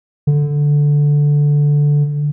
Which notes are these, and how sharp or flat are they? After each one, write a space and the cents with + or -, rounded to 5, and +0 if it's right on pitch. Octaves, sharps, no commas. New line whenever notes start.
D3 -5